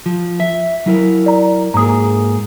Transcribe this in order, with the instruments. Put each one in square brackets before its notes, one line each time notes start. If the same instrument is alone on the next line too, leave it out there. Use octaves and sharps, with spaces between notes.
[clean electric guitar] F3
E5
F#3 E4 A#4
[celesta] D5 A#5
[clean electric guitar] G#2 A#3 G#4 [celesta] A#5 D#6